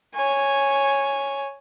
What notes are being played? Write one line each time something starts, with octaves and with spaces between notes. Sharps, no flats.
C#5 G#5